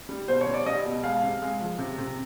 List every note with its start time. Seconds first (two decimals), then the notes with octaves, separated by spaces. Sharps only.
0.09 G3
0.28 B2 C5
0.41 C#5
0.47 G3
0.54 D5
0.66 G3 D#5
0.85 B2
1.03 G#3 F5
1.23 C3
1.42 G#3
1.61 F3
1.78 C3
1.98 C3